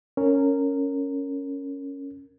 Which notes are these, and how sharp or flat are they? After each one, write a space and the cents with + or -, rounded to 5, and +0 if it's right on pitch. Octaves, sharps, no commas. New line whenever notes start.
C#4 +0 A#4 -15